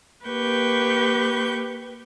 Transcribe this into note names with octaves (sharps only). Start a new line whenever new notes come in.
A#3 G4 B4 C#6 G6